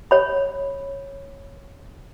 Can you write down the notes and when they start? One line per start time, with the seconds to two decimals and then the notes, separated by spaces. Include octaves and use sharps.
0.11 C#5 B5